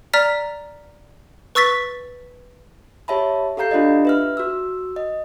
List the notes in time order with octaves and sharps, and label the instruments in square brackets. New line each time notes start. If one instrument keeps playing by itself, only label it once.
[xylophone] D5 A#5 F6 A6 B6
B4 C#6 E6 A6 B6
[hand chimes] G4 C#5 E5 A5 B5
G4 A4 F5 A#5 G6 C7
D4 F4 G4 D5 D#5
B4 E5 F6
F#4 E6
D#5